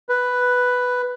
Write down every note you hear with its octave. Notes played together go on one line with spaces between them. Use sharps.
B4